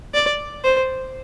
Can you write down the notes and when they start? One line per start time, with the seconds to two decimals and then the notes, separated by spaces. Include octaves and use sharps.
0.14 D5
0.63 C5